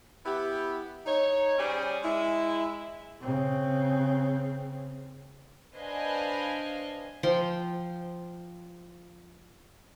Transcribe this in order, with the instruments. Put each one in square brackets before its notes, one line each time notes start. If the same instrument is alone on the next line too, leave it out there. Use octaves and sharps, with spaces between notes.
[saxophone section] B3 E4 G4
D#4 C#5
G3 C#4 G#4 C5 D5
G#3 E4
[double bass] C#3 C4
[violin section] D4 B4 C5 D#5 F5 G#5
[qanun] F3 G5 C6